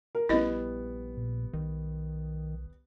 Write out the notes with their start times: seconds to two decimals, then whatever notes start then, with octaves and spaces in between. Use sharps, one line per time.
0.15 A#4
0.29 A#1 G3 B3 E4 D#5
1.17 A#2
1.53 B1 D#3